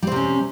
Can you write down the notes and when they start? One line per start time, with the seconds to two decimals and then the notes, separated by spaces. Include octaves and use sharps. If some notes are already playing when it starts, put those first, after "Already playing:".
0.03 G3
0.07 C4
0.12 C3
0.16 C#4